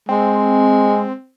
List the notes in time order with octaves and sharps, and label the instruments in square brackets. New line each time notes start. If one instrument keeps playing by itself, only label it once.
[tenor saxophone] G#3 [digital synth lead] C4